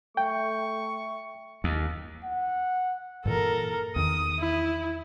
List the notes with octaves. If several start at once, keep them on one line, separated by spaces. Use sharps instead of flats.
A3 G5 C#6
D#2
F#5
G2 A#2 E3 A4 A#4
E2 D#3 D#6
E4